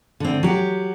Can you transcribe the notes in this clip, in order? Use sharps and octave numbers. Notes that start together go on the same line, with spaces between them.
D3 C4
F#3 G4